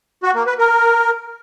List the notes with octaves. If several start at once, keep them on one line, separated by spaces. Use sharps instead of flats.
F#4
A#3
B4
A#4